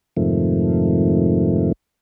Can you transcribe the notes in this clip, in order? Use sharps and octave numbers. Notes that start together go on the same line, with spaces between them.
F2 G#2 C3 D#3 F3 A3